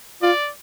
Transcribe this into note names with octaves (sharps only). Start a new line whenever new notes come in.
F4 D5